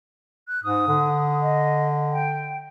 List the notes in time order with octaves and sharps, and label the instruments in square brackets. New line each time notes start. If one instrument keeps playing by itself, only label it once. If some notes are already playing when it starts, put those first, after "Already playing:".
[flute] F#6
[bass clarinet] G#2 [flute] D#6
[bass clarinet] D3
[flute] D#5
G5